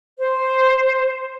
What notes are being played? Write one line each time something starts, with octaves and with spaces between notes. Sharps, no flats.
C5